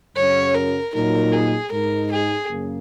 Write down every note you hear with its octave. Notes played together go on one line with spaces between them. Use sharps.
F#2 C#3 F#3 C#4 C#5
A#4
A#2 F#3 D#4 A#4
G#4
G#2 G#3 D#4 A#4
G#4
F#2 C#3 A#3